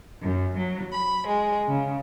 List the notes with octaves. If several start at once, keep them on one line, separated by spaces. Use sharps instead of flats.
F#2
F#3
B5
G#3
C#3